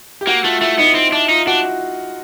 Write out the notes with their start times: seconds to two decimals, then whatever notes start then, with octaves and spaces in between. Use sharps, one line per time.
0.21 G4
0.27 A#3 F#4
0.44 A3 F4
0.61 A3 E4
0.78 B3 D#4
0.95 C4
1.12 D4 E4
1.29 D#4 F4
1.47 D4 F#4